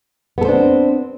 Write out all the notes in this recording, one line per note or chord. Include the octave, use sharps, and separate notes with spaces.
B3 C4 D4 A4 C5